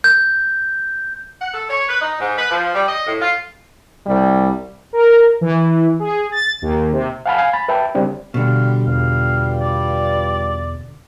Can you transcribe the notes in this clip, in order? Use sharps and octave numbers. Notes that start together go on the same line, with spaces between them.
G6
F#5
A4
C#5
B4
D#4
G#2
B4
F3
G3
D#5
A2
F4
C2 G3
A#4
E3
G#4
A6
D#2
C3
F5 F#5 G#5 A5 B5 F6
F5 G#5
B5 A6
B4 E5 G5 A5
C#3 G3 C4 D4
B2 D3 G3 F5
E2 G3 F4 B4 F5
D5